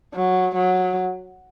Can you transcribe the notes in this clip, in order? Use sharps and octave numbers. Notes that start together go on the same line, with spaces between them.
F#3
F#3